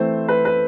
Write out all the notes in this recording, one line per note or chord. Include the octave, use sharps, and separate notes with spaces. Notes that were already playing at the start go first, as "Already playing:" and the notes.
Already playing: E3 A3 C4 C5
B4
B4